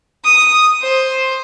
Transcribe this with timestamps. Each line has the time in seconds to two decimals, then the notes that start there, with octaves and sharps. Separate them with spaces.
0.25 D#6
0.82 C5